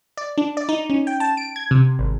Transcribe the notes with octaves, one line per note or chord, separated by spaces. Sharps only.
D5
D4
D5
D#4
C#4
G5
A5
D7
G#6
C3
G#1